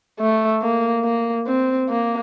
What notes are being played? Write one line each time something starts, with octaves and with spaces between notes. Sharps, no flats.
A3
A#3
A#3
C4
A#3